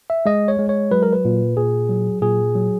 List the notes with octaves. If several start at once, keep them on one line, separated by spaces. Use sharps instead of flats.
E5
G#3 D#5
C#5
G#3
C#5
F#3 B4
A#4
B4
A#2
A#2 G#4
F#3
A#2 G#4
F#3